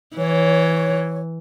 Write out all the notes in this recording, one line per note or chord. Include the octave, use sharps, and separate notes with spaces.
E3 C#5